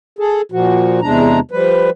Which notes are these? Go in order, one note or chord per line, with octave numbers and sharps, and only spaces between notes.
G#4 A4
A#2 F3 F#4
E2 C3 G#3 D4 A#5
F3 G3 B4